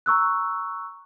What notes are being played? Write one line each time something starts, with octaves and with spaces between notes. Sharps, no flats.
A#5 C#6 E6 F#6